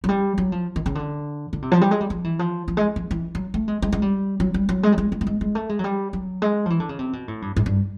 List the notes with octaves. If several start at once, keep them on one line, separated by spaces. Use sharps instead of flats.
F#3
G3
F#3
F3
D#3
C#3
D3
D3
C3
F3
G3
G#3
G3
F3
E3
F3
F3
G#3
F3
E3
F#3
A3
G#3
G#3
G#3
G3
F#3
G3
F#3
G#3
G3
G#3
G#3
A3
G#3
G#3
A3
G#3
F#3
G3
F#3
G#3
F3
E3
D3
C#3
C3
B2
A2
G2
G#2
G2